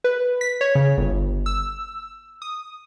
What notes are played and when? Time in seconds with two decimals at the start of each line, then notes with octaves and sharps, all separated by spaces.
0.04 B4
0.41 B6
0.61 C#5
0.75 C#3
0.97 G1
1.46 E6
2.42 D#6